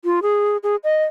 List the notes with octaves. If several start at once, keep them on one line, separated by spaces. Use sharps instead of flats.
F4
G#4
G#4
D#5